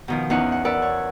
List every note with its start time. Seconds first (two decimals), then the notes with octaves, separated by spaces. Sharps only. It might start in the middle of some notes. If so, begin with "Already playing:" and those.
0.08 B2 D#3 F3
0.30 E2 C#4 D#4 F5 F#5
0.52 F#5
0.65 A#4 B4 D5 F#5 E6
0.82 C#5